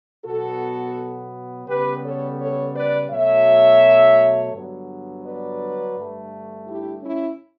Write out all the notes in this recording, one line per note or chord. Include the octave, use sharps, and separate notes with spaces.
B2 F#3 B3 F#4 A4
C#3 G3 B3 G4 B4
A4 C#5
A4 C#5
B4 D5
B2 F#3 A3 C#5 E5
G2 D3 F#3 B3
B4 D5
G2 D3 A3
E4 G4
C#4 E4